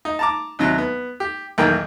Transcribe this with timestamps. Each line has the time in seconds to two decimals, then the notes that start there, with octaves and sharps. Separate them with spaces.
0.05 D#4
0.19 A5 A#5 D6
0.59 D#2 C3 F#3
0.78 B3
1.20 G4
1.58 B1 E2 D#3 A#3 G5 A#5